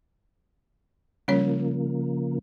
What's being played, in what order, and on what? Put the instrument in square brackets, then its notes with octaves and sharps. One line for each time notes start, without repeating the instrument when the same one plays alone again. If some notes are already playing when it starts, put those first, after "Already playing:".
[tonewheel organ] C#3 F3 A#3 [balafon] G3 C#4 C#5